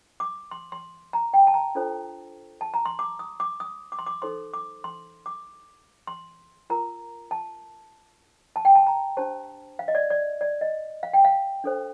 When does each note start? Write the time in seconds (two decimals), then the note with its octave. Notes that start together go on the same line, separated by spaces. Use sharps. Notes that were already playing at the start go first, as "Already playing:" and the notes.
0.20 D6
0.51 C6
0.72 C6
1.13 A#5
1.34 G5
1.47 A5
1.54 A#5
1.75 D4 F4 A4 C5
2.61 A5
2.74 A#5
2.86 C6
2.99 D6
3.19 D#6
3.40 D6
3.60 D#6
3.92 D6
3.99 C6
4.06 D6
4.22 D#4 A4 C5 C6
4.54 D6
4.84 C6
5.26 D6
6.07 C6
6.70 F4 A#4 A#5
7.31 A5
8.56 A5
8.65 G5
8.75 A5
8.87 A#5
9.17 D4 G4 C5 A5
9.79 F5
9.88 D#5
9.95 D5
10.10 D5
10.41 D5
10.61 D#5
11.03 F5
11.13 G5
11.25 F5
11.64 D4 A4 C5